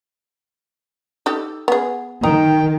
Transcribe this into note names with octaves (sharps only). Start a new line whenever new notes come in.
D#4 G4 A4
B3 G#4
D#3 D#4 G5